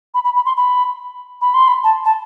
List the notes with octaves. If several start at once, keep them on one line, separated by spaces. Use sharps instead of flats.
B5
B5
B5
C6
B5
B5
C6
B5
A5
A5